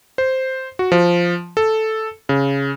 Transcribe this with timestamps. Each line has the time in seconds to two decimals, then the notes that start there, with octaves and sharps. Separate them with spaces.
0.18 C5
0.79 F#4
0.92 F3
1.57 A4
2.29 C#3